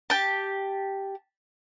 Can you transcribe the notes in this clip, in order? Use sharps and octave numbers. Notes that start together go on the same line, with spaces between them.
G4 A5